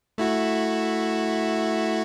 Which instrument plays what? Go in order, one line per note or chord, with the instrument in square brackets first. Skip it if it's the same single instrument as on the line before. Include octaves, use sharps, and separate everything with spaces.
[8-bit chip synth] A3 E4 F#4